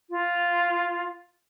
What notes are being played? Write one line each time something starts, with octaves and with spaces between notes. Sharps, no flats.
F4